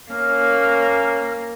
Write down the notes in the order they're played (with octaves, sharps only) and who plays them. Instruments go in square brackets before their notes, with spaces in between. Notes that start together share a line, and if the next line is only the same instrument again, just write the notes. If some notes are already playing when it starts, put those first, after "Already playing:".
[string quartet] A#3 [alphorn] C#4 [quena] F6